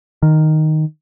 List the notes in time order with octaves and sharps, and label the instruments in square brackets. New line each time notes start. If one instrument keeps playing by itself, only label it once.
[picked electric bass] D#3